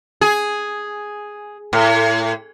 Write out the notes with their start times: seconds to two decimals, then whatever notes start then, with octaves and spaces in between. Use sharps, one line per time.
0.21 G#4
1.73 A2